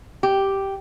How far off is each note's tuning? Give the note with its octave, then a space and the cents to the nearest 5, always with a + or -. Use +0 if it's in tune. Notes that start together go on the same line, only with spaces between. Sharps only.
G4 -5